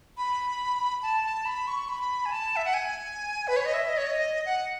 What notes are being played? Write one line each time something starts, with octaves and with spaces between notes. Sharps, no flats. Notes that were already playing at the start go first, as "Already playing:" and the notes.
B5
A5
A5
B5
C#6
B5
G#5
A5
E5
F#5
G#5
B4
C#5
D#5
E5
D#5
C#5
D#5
F#5